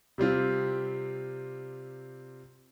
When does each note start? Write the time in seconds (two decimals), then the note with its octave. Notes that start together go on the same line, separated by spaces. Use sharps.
0.18 C3 G3 C4 F4